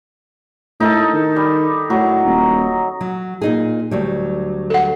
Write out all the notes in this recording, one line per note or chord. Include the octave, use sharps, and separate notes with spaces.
A2 D#4 A4
D#3
G3
A2 F#3
D#1
F#3
A#2 D#4 G#4
D2 F#3 G3
A4 F#5